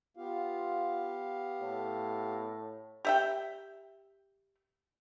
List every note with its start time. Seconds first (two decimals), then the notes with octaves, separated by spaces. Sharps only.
0.17 B3 F4 G4 F5
1.62 A2
3.05 G4 E5 G5